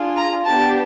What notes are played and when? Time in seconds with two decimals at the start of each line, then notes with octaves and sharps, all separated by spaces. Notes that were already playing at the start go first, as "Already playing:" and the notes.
Already playing: D4 F4 G#4
0.17 A#5
0.44 B3 D4 G4 A5